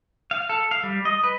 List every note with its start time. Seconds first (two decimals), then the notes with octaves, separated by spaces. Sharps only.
0.31 F5
0.49 A4
0.71 F5
0.83 G3
1.05 D#5
1.23 B4